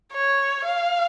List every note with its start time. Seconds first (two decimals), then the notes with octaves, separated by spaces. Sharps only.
0.13 C#5
0.65 F5